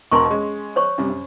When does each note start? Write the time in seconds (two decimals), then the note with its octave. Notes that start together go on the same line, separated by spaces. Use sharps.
0.12 E1 B2 A#4 C6 C#6
0.31 G#3 C#4
0.76 C5 C#5 C#6
0.98 F#2 C3 G3
1.10 F#2